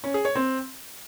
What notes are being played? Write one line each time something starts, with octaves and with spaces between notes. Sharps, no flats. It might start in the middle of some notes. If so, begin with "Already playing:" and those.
C#4
G#4
C#5
C4